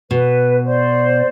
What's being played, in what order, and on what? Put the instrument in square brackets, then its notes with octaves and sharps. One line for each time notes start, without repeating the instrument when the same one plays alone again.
[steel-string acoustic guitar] B2 [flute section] B4
[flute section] C5 D5